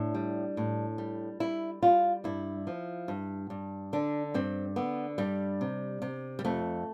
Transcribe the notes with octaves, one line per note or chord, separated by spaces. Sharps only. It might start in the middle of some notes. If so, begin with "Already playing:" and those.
Already playing: A2 D4
G3
A2
G3
G3 E4
G3 F4
G2 E4
F3
G2
G2
D3 D4
G2 C4
D3 B3
G2 G3
C3
C3
G3
F2 A3